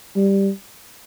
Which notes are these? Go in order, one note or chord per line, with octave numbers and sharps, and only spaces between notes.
G3